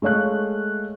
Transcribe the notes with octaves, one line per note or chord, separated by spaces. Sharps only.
G#3 A3 C#5 F5 F#6